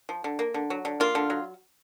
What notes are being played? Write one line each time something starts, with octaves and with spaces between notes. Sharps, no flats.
F3
D3
A#3
D3
F#3
D3
A#3 F4
D3
F#3